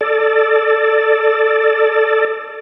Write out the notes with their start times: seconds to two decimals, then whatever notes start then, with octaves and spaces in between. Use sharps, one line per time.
0.01 A4 D5